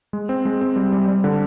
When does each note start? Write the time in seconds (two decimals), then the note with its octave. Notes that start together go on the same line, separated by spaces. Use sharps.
0.13 G#3
0.29 C4
0.45 G#3
0.61 C4
0.76 G3
0.92 G3
1.08 G3
1.24 D3